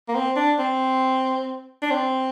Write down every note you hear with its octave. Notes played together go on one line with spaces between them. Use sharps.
A#3
C4
D4
C4
D4
C4